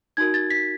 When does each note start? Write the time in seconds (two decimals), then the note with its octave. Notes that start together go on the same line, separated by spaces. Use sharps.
0.17 D#4 F#4 A#4 G#6
0.34 A6
0.50 B6